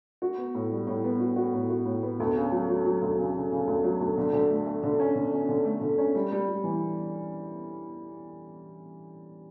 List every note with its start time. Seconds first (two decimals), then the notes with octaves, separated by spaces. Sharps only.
0.22 F#4
0.38 B3
0.55 A2
0.71 G3
0.87 A2
1.04 B3
1.20 F#4
1.36 F#4
1.54 A2
1.70 F#4
1.86 A2
2.03 B3
2.20 D2
2.36 C#3
2.52 F#3
2.69 F#3
2.85 F#3
3.02 D2
3.18 C#3
3.34 C#3
3.51 C#3
3.67 D2
3.84 F#3
4.01 D2
4.18 D3
4.33 D3
4.50 A3
4.66 A3
4.83 D3
5.00 C#4
5.15 D3
5.33 C#4
5.49 D3
5.65 A3
5.81 D3
5.98 C#4
6.15 G3
6.32 G3
6.48 G3
6.64 E3